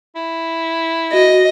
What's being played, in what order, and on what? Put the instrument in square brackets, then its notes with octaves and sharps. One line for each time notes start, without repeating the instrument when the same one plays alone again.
[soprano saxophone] E4
[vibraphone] F#4 [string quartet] D#5